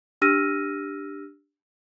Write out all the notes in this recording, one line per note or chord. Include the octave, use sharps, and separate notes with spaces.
D4 G4 E6 F6 A#6 D#7